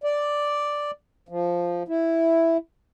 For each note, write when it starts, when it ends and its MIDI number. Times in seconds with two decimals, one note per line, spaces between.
0.04 0.91 74
1.29 1.83 53
1.88 2.57 64